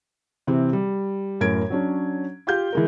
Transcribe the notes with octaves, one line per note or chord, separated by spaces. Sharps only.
C3 E3 C4
G3
F#2 A2 A#4 G#6 D7
F#3 C#4 D4
F4 G4 F5 G6
E3 G#3 A#4